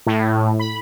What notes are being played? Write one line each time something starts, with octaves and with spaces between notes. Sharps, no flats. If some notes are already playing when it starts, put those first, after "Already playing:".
A2
B5